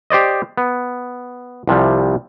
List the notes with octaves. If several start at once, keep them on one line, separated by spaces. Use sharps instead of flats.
G4 C5 D5 D#5
B3
C2 C3 F3 G3